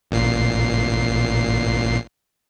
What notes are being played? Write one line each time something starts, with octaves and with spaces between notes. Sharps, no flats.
A1 A#2 C7